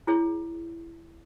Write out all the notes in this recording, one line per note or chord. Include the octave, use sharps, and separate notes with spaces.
E4 G#4 C#5